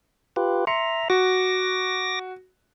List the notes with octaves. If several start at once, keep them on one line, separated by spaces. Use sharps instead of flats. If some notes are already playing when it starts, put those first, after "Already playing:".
F4 G4 B4
E5 A#5 C6 C#7
F#4 D6 A#6